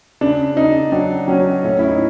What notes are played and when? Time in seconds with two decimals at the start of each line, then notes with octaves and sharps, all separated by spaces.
0.21 C#3 D4
0.57 C#3 D#4
0.92 F#3 D4
1.28 F#3 C#4
1.64 A2 C#4
1.79 E4
1.89 D#4